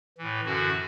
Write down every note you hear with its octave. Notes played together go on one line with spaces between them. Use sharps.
A2 E3
F#2 D3 F#4